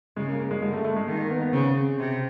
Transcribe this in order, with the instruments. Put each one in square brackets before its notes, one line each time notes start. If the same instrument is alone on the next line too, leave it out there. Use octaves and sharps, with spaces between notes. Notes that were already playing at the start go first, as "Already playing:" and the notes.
[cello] C#3 [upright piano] G#3
[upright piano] A#3
A#3
G#3
[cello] D3 [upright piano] G#3
[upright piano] A3
A3
G#3
[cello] D#3 [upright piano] A#3
[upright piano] A#3
B3
B3
[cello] C#3 [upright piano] C4
[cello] C3